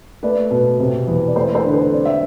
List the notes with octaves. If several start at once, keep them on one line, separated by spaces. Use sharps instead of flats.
A3 B4 D5
B2
C3
E2
D5
A3 A4 C5
A4 C5
D3 B4
A4 C5
C4 D5
E5